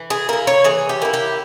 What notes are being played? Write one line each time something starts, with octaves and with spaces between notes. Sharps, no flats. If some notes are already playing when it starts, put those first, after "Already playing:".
Already playing: E3
G#4
A#3 E4 A#4
C#5
E3 G#4
G4
A#3 E4
G4